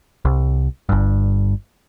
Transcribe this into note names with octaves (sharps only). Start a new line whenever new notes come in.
C2
G1 G2